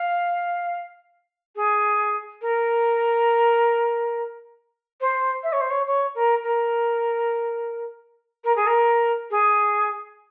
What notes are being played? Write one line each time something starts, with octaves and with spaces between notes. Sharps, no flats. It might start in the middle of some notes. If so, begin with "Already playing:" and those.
Already playing: F5
G#4
A#4
C5
E5
C#5
C5
C#5
C#5
A#4
A#4
A#4
G#4
A#4
G#4